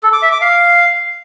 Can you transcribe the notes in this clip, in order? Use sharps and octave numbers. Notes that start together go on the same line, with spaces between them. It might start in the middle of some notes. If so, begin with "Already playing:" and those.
A4
D6
E5
D6
F5